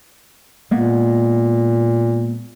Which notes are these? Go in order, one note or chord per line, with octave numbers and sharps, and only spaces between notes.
A#2 G#3 A#3 B3